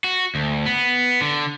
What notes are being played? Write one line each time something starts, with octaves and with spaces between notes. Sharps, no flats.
F#4
D2
B3
D3